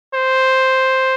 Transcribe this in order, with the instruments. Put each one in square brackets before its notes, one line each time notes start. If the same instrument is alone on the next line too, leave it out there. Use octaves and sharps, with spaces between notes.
[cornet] C5